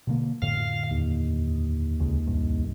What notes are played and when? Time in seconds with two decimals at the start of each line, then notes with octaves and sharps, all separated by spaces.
0.07 B2 D3 A#3
0.42 F2 A2 D3 F5
0.91 D#2
2.00 C#2
2.27 C2 G2